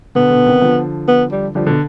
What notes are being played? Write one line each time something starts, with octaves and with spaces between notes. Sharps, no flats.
B2 D3 B3
B2 D3
C3 D#3
D3 F3
B3
G3
D3 F3 G3
B2 D3